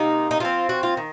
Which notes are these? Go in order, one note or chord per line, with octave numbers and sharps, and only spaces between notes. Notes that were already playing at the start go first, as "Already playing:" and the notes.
Already playing: C3 D#3 A#3 D#4
D#4
F3 C4 F4
F#4
F4
D#3